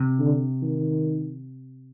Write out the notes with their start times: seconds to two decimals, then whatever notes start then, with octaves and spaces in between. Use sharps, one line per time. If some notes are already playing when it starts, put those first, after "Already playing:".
Already playing: C3
0.19 D3
0.62 D#3